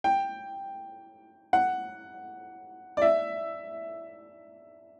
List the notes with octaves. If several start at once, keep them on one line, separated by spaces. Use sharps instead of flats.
G5
F#5
D5
E5